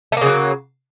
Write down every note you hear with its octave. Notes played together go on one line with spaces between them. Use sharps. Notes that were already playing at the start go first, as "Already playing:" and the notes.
C#3 F#3 A3 A#3